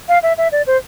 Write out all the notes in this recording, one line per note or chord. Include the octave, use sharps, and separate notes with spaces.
F5
E5
E5
D5
C5